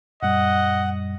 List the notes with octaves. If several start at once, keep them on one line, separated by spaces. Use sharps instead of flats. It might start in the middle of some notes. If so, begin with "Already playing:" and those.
F#2 A#2 G3 D#5 F#5